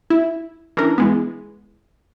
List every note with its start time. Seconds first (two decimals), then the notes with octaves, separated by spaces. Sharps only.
0.10 E4
0.77 E3 C#4 D4 A#4
0.98 E3 G#3 B3